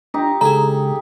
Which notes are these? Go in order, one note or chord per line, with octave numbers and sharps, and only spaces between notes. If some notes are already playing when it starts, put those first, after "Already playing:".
D4 D#4 G4 A#5
C#3 G#3 G#4 A4 A#5